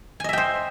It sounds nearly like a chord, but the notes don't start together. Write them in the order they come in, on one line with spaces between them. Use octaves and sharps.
G#5 D#5 E5 G5 C5